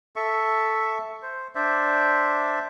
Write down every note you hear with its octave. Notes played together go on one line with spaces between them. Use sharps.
A4 E5 C#6
C5
D4 C5 D5 E5